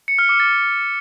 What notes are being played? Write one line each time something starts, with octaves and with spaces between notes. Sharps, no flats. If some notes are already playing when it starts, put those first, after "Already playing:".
C#7
F6
D6
A6